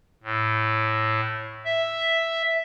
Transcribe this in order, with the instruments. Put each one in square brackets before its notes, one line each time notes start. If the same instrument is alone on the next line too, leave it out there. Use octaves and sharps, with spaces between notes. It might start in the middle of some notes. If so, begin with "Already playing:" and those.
[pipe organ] A2
E5